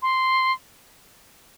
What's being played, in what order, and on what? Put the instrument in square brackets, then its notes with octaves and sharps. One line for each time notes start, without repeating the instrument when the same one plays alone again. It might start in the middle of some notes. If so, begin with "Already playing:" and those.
[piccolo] C6